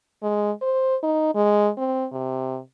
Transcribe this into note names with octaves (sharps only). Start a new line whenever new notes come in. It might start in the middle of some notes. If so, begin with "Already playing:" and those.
G#3
C5
D#4
G#3
C4
C3